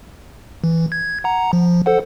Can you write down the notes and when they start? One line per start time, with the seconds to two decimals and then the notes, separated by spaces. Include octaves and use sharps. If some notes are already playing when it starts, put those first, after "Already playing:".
0.64 E3
0.92 G#6
1.24 F#5 A#5
1.53 F3
1.86 A4 C5 F#5